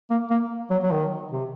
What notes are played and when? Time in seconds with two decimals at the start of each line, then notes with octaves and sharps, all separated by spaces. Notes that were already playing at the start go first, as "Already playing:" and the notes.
0.10 A#3
0.30 A#3
0.70 F#3
0.83 F#3
0.91 D#3
1.31 C3